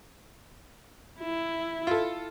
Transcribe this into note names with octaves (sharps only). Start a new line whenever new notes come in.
E4
F4 A4